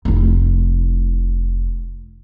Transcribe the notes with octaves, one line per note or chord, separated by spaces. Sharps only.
F1 E4